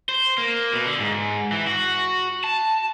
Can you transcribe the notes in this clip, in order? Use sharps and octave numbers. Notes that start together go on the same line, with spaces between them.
C5
A#3
B2
D3
G#2
E3
F#4
A5